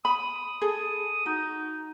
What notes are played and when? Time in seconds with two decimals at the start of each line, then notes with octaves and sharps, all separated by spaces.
0.05 B5 D#6
0.62 G#4 A4
1.26 D#4 F#4